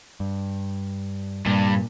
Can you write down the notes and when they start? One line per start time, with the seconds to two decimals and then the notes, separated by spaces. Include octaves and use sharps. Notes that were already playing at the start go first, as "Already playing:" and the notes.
0.20 G2
1.46 G2 A#2